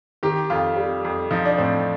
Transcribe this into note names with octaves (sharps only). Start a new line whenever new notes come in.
D#3 G4
F2 F4
G3
F2
F3 D#4
D4
A2 C4